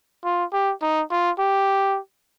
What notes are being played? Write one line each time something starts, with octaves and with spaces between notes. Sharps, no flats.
F4
G4
D#4
F4
G4